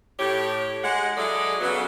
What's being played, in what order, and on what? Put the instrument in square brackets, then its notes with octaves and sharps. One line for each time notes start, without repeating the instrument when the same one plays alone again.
[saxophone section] A2 G4 C#5
G#3 F#5
F#3 G#3 E4 G#4 A4 D5
C#3 F#3 B3